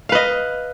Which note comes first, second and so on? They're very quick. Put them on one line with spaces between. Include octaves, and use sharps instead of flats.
F5 B4 D#5